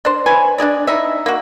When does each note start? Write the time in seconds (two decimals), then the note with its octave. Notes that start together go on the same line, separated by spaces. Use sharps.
0.05 D4 C5
0.26 B4 C#5 G#5
0.58 D4 D#4 G#4 D5
0.87 D#4 E4 D#5 E5
1.26 A#3 F#4